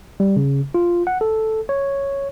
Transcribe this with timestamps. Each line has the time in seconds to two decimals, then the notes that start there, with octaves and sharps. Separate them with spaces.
0.20 G3
0.37 C#3
0.75 F4
1.07 F#5
1.21 A4
1.69 C#5